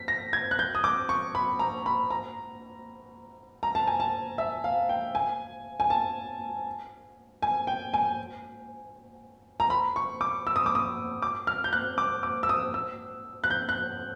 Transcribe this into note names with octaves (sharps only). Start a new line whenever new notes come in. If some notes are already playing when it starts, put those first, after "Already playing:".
Already playing: B6
A#6
G#6
F#6
G6
D#6
D6
C#6
B5
A#5
B5
A#5
A#5
A5
G#5
A5
E5
F5
G5
G#5
G#5
A5
G#5
G5
G#5
A#5
B5
C#6
D6
E6
D#6
D6
D#6
D6
F6
G6
F#6
D6
D6
E6
D#6
E6
F#6
G6
F#6